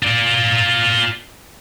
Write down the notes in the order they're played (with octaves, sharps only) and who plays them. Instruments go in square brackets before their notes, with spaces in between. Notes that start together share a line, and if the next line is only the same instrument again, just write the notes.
[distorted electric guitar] F4 D5